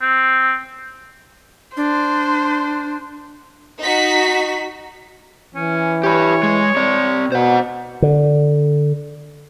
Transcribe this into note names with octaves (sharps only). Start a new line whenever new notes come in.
C4
D4 C5
D#4 F#4 B6
E3 C#4
G4 B4 C#5
G#3
C4 D5
B2 C5 F#5
D3